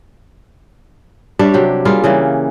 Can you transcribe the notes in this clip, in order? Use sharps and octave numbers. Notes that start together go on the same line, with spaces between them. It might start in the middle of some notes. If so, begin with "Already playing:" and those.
G3 D4 C#5 E5
C3 F#3 G4
G3 A#3 F4 G#4
C#3 E3 G3 A#3